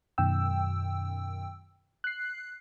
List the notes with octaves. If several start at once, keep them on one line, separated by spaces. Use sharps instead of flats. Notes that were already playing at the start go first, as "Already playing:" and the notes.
F#2 B2 D#3 G5 E6
F#6 C7